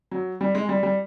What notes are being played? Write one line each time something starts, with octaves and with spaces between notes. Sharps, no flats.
F#3
G3
G#3
G3
G3